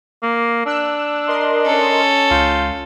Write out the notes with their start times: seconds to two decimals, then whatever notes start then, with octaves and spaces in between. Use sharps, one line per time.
0.23 A#3
0.66 D4 E6 F#6
1.27 A#4 D#5 C6
1.65 C#4 A4
2.31 C#2 F4 G6